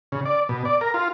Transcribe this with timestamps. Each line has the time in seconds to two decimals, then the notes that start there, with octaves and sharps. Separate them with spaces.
0.12 C#3
0.26 D5
0.49 B2
0.65 D5
0.81 A#4
0.94 F4